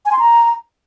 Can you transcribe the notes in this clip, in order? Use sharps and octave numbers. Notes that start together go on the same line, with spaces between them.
G#5
C6
A#5